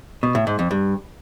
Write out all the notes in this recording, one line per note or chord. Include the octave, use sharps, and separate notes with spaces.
B2
A2
G#2
F2
G2